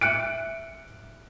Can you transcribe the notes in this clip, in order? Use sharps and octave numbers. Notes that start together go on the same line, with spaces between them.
E5 F#6 C#7 D7